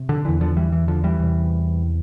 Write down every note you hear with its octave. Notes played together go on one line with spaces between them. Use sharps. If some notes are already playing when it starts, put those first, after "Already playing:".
Already playing: C3
D3
E2 D3 E3
D3 F3
E3 G3
E3
D3 F3
E3 G3
E2 C3